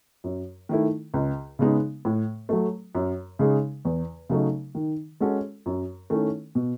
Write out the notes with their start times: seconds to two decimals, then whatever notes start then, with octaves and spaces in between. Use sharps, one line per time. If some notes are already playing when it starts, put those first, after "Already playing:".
0.24 F#2
0.69 D#3 A3 E4
1.14 C#2
1.59 C#3 G#3 B3 D#4
2.05 A2
2.49 F#3 A3
2.95 F#2
3.39 C#3 G#3 D#4 G#4
3.85 E2
4.30 C#3 F#3 A3 D#4
4.75 D#3
5.20 G#3 C#4 F#4 A4
5.66 F#2
6.10 D#3 A3 C#4 E4
6.55 B2